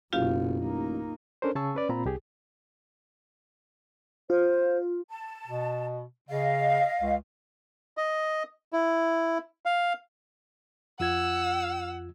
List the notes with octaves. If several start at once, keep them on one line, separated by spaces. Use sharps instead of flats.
F#1 F#2 B2 F4 G4 F5
A1 A#3 D#4
C#4 D4 A4 A#4 C5
C#3 G#4 A5 C#6 E6
C#4 B4 D5
A#2 C4 F4 A#5 B5
C2 G4 G#4
F4 C5
A5
B2
C#3 D#5 F5
C#2
D#5
E4
F5
F2 F4 F#5 E6 G#6